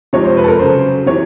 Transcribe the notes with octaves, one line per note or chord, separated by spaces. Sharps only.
C3 F3 G#3 C#5
C5
B4
A4
A#4
C#3 F#3 C5
C3 E3 C#5